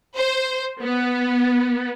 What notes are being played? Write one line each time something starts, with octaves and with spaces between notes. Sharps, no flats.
C5
B3